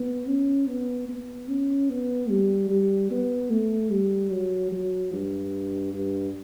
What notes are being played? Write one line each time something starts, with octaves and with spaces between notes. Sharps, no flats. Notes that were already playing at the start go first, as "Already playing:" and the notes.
Already playing: B3
C#4
B3
B3
C#4
B3
G3
G3
B3
A3
G3
F#3
F#3
G2
G2